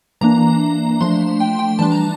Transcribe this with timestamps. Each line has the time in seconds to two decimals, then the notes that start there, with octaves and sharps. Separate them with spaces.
0.21 E3 A#3 D4 A#5
1.01 F3 A3 D4 C6
1.40 G5
1.59 G5
1.79 E3 G3 D4 A5
1.92 A#5